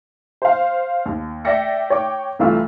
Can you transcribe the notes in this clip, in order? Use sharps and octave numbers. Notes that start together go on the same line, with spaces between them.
C5 F5
D#2
D5 E5 G5 A#6 C#7
C#5 G5 D6
C2 E3 A3 F4 E6